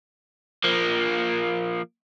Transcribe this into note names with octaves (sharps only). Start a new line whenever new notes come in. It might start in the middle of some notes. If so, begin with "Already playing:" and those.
F3 A#3